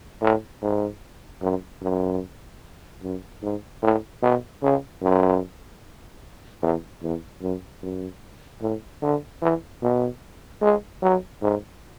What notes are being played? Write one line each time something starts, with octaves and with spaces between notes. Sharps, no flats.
A2
G#2
F#2
F#2
F#2
G#2
A2
B2
C#3
F#2
E2
E2
F#2
F#2
A2
D3
E3
B2
G#3
F#3
G#2